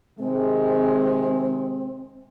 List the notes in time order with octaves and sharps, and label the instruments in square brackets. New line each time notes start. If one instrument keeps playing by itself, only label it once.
[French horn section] C3 D#3 G#3 [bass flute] C4